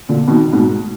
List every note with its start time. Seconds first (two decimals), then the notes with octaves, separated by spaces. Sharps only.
0.09 A#2 D3
0.28 B2 D#3
0.53 G#2 B2